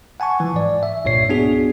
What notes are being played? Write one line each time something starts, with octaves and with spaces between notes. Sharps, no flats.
F#5 G#5 A5 C#6
E3 F3
G#2 D5
E5
C2 G2 A#2 C#5 C7
B3 D4 F#4 G#4